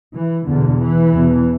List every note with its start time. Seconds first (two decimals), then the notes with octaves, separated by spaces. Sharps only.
0.15 E3
0.47 E2 B2 D3
0.81 E3
1.13 E2 B2